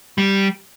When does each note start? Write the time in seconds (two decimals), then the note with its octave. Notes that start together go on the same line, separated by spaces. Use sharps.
0.18 G3